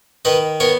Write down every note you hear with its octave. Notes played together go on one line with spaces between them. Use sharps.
D#3 B4 D#5
B3 A#4 C#5